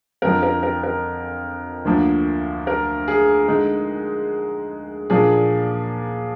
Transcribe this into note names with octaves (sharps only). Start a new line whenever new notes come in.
F2 D3 F3 A#4
A#4
A#4
A#4
D2 D3 F3 A#3
A#4
G#4
D3 G#3 D#4
A#2 F3 A#3 D4 G#4